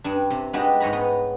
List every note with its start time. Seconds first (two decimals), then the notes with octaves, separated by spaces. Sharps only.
0.04 G2 D4
0.30 C3
0.53 G#3 B3 D4 D#4 F#4 G4
0.80 G#2 C#5 G#5 A#5 B5
0.93 B3